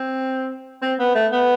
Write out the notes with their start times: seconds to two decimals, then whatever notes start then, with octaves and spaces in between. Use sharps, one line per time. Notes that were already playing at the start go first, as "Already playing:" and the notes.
Already playing: C4
0.82 C4
0.99 B3
1.15 A3
1.32 B3